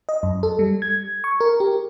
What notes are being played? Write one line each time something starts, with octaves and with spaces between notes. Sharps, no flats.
D#5
F#2
A4
G3
G#6
C#6
A#4
G4